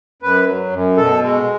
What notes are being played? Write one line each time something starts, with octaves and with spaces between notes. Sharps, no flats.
F#2 B4
F#3
F#2
B2 A4
G#3